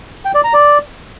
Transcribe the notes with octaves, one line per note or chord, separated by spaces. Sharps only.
G5
D5
A#5
D5